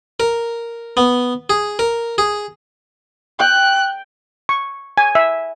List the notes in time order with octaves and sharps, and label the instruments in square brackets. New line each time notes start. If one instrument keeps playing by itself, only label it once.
[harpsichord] A#4
B3
G#4
A#4
G#4
[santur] G5 [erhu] F#6
[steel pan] C#6
G#5
E5